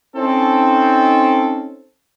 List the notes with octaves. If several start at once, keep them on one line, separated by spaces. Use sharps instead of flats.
C4 C#4 D#4 A4